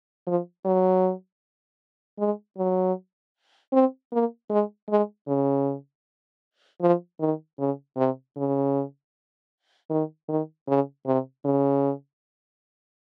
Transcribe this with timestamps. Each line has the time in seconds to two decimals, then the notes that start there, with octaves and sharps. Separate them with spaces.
0.27 F3
0.65 F#3
2.19 G#3
2.58 F#3
3.73 C4
4.12 A#3
4.50 G#3
4.89 G#3
5.28 C#3
6.81 F3
7.20 D#3
7.59 C#3
7.97 C3
8.36 C#3
9.90 D#3
10.29 D#3
10.68 C#3
11.06 C3
11.45 C#3